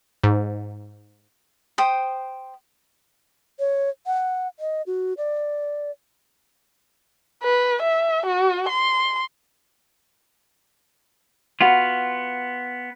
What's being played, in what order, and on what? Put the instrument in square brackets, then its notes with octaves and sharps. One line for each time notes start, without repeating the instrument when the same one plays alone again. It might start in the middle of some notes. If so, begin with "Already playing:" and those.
[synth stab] G#2
[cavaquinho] C5 G5 D#6
[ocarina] C#5
F#5
D#5
F#4
D5
[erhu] B4
E5
F#4
C6
[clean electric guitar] B3 F4 [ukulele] F#4 F#5 B5